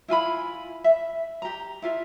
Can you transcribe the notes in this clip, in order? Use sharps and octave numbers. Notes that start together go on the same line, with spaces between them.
E4 F4 G#5 B5
E5
G4 A#5
E4 F4 E5